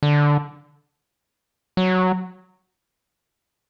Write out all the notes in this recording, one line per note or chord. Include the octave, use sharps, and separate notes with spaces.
D3
F#3